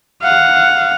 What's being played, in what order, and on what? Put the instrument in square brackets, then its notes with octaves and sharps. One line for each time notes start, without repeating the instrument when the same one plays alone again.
[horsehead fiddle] F5 F#5